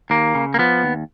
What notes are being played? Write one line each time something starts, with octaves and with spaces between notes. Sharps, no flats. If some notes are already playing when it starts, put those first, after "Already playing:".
D#2 A#3
C#3
A#3
F3 B3
D#2